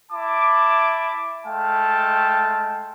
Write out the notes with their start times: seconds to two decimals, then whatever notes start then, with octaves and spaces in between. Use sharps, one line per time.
0.12 E4 A5 D6
1.46 G#3 A3 F5 G5 A5